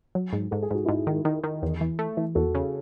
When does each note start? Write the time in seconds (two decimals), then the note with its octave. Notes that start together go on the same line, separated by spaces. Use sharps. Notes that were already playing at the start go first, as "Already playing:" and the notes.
0.15 F#3
0.33 G#2
0.51 G#2 A4
0.62 G#4
0.71 G#2 F#4
0.85 G#2 E4 G#4
1.07 D#3
1.25 D#3
1.44 D#3
1.63 E2
1.81 E3
1.99 A3
2.17 E3
2.35 E2 F#4 A4
2.55 C#3